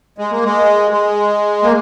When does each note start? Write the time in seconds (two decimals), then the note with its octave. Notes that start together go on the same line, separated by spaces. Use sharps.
0.18 G#3
0.31 A#3
0.45 G#3
0.91 G#3
1.63 A#3